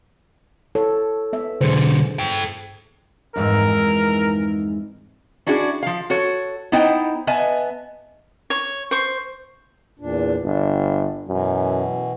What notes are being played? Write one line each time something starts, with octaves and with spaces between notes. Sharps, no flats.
E4 A4 C#5
B3 E5
B1 D3 G#4 C5
A4 G5
F2 G#2 E3 A#4
C#4 D4 E4 F#4 G#4
F3 F5
F#4 A4 C#5
B3 D#4 E4 C5 D#5 G5
B3 B4 D#5 E5 G#5 A5
C#5
C5 C#6
E2 A#2 D4
G1 D4
F#2 B2 E3